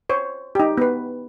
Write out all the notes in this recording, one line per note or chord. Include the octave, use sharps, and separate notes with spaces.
C5 C#5
D#4 G4
B3 B4